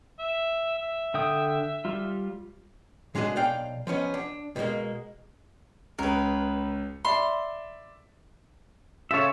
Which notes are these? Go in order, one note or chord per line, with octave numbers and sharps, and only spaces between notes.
E5
E5
D3 G5 D#6
G3 F4
A2 G#3 D4 F#4 G#4 D#5
B1 D5 F5 G5
F3 B3 C#4 D#5
D4
B2 D#3 G3 G#3 A#3
C#2 C#3 A#4 B4
D5 E5 B5 C6
C#3 F4 A4 C#5 E5